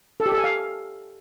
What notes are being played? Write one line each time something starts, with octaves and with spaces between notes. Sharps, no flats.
A4
G4
A4
G#5
F5